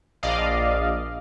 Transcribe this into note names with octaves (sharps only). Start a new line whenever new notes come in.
A#1 D5 D#5 F5